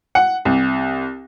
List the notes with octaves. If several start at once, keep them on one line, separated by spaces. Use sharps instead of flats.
F#5
C2